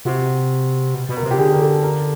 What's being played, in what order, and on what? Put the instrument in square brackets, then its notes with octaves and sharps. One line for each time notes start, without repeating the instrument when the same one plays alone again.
[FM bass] C3 [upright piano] F#4
[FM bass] B2
B2
[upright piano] A#4
[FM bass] C3
[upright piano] G4
[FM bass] D3 [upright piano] G#4
[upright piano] A#4
A4
A#4